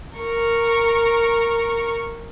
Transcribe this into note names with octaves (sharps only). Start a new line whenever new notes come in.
A#4 C#6